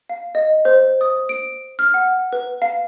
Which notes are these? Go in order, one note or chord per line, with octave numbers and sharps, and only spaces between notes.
F5
D#5
C5
D#6
D7
F6
F#5
B4
F5